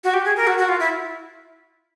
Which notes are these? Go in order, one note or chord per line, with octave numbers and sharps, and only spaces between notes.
F#4
G4
G#4
A#4
F#4
F#4
F4
E4